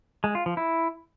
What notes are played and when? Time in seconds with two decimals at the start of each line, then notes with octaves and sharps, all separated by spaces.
0.24 G#3
0.35 F4
0.46 F3
0.57 E4